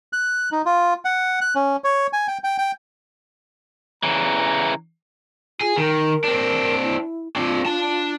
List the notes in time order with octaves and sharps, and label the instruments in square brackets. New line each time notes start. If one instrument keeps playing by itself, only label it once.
[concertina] F#6
D#4
F4
F#5
F#6
C#4
C#5
G#5
G5
G5
G5
[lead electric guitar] C#3 E3 [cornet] A#5
[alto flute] F4 [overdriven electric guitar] G#4
[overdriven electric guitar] D#3 [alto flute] A#4
[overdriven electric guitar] C4 D4
[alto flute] E4
[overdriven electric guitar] C4 D4 [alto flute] F4
[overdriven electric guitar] D4 A5